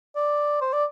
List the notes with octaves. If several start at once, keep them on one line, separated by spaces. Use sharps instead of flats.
D5
C5
D5